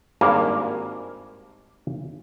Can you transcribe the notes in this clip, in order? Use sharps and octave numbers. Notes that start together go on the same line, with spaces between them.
G#1 G2 A#3 D5 G#5 A5